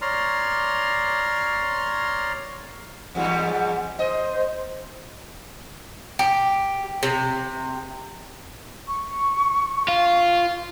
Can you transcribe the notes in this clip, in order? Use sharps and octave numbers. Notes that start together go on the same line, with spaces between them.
C#5 D5 A#5 C6 F6
E2 G#2 G3 F#5
C5 D#5
G4
C3
C#6
F4